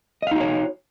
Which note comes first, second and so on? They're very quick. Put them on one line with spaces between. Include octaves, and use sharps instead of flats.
D#5 F5 D#4 F#4 C#5